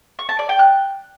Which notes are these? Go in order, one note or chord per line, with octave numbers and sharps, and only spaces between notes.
C#6
A5
D5
G5
F#6